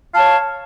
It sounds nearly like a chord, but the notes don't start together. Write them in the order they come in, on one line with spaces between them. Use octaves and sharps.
F5 A5 C#5